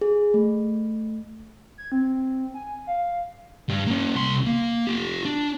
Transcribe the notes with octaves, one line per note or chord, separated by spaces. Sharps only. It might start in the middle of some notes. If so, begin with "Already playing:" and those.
G#4
A3
G#6
C4
G#5
F5
G2 G3
A#3 C#4
C2 C6
A#3
F4 G4
D4